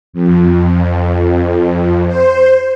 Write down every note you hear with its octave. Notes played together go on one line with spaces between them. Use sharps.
F2
C5